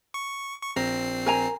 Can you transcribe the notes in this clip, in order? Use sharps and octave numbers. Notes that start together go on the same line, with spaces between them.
C#6
C#6
A#1 C4 A#4 C7
A#4 G#5 A#5